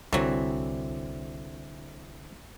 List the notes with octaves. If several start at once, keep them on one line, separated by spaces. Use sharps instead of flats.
C2 D3 E3 F#3 C4